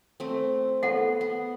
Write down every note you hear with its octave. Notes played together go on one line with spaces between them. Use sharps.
A3 C4
B3 A4 F#5
B3